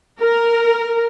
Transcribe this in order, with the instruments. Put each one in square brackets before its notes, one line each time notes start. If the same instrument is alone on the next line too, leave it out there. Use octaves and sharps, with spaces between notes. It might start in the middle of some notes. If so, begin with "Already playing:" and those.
[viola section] A#4